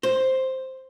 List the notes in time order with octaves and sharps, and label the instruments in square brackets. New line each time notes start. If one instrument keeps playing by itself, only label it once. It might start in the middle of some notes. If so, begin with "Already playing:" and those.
[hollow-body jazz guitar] C5